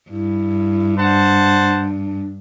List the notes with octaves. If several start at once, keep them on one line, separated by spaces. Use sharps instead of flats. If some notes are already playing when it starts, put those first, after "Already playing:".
G2 E4
D4 C5 F#5 A5